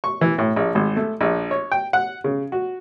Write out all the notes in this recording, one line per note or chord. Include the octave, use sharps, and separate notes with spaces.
C#6
E3
A2
A#1
G#1
A3
A#1
C#5
G5
F#5
C#3
F#4